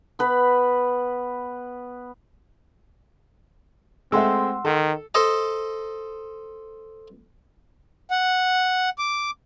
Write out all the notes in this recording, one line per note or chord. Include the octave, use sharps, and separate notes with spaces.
B3 B4 B5
G#3 A3 C4 E5 F#5 C6 E6
D#3 A4
A4 C5 D#5 A5
F#5
D6